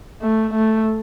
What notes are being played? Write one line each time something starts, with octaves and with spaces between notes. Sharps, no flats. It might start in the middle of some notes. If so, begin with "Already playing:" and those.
A3
A3